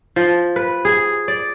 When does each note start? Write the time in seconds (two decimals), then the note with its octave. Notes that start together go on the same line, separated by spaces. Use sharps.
0.16 F3
0.56 B4
0.85 G#4
1.28 D5